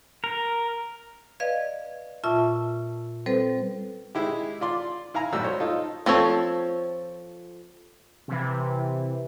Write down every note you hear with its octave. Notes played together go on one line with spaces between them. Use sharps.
A#4
B4 D5 D#5 F5 G#6
A#2 F4 E5 A5 C#6 E6
G3 C4 A4 B4 C5
G#3 E4 G4
F4 D5 C6
E4 F5 G#5 A#5
B1 A2 G3 F#4 E6
C5 C#5
D#4 F4 A4
F3 C4 A4 C#5
C3 E3